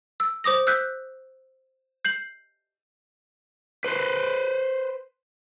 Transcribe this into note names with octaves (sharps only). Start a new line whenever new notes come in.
E6
C5 D6 D#6 A#6
E6 F#6 G6 B6
G6 C7 F#7
B4 C5